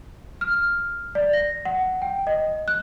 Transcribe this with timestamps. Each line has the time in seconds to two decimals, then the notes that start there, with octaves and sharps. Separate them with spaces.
0.41 F6
1.15 D5
1.33 A#6
1.65 F#5
2.02 G5
2.27 D#5
2.68 F#6